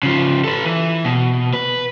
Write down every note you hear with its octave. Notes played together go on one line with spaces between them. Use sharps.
C#3 F3
A4 B4
E3
B2
B4